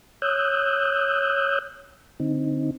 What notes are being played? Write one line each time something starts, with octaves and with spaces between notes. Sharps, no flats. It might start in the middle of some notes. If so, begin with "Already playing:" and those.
C#5 D#6 E6 F#6 G6
D3 C4 D#4